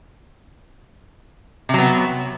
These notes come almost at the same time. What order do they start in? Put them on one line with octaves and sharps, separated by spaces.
C3 F#3 B3